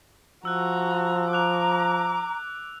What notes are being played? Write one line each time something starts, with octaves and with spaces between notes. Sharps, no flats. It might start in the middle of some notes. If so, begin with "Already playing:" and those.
F3 F#4 A#5 E6 F#6
A#5 D6 F#6 F7